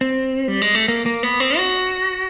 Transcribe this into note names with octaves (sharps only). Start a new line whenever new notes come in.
C4
G3
G#3
A3
A#3
A#3
B3
C4
F#4